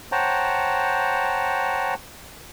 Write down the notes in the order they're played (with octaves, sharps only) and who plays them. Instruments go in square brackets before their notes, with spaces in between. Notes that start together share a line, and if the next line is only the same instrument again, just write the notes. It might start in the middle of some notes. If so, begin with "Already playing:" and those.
[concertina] C5 C#5 F#5 G5 A5 A#5